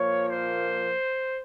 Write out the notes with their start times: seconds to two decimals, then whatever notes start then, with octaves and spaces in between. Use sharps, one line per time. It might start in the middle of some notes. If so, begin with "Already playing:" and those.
Already playing: A#2 F3 A#3 C#5
0.27 C5